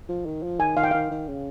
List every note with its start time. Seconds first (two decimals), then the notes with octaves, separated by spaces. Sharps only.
0.09 F3
0.26 D#3
0.43 F3
0.60 D#3 G#5
0.77 D#3 F5
0.83 G5
0.91 D#3 F5
1.11 D#3
1.28 C#3